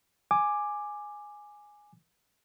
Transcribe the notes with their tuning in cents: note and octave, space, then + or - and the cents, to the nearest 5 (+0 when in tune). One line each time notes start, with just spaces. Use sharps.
G#5 +0 D6 +10